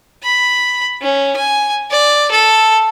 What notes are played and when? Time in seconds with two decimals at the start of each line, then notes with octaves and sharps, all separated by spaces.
0.23 B5
1.02 C#4
1.36 G#5
1.91 D5
2.31 A4